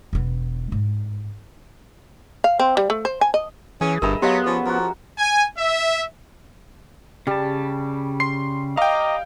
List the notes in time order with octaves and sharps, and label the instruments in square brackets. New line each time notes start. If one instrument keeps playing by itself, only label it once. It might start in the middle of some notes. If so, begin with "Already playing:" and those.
[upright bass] E1 B3
G#2
[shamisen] F5
C4
G3
A3
C5
G#5
D#5
[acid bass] E3 [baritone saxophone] C#4 [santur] G#4
[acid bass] G1 [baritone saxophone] G2 [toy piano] A#4 B5 [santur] D#5 E5
[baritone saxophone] F#3 [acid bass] B3 [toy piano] G4 D#5 F5 [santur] C6
[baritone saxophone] F3 [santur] C#4
[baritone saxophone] F3 [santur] F#4 A#4
[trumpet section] G#5
E5
[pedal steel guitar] C#3 A5 [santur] G3
[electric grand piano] C6 C7
[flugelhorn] D#5 [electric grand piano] F5 G5 [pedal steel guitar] A#5 D6